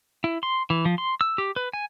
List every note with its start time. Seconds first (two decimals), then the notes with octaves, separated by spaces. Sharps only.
0.24 E4
0.43 C6
0.70 E3
0.85 F3
0.98 C6
1.21 E6
1.38 G4
1.56 B4
1.73 G#5